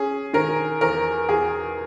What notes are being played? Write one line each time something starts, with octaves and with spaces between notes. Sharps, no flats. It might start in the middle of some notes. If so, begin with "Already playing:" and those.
Already playing: C#4 G#4
D#3 A#4
E2 A#4
E2 G#4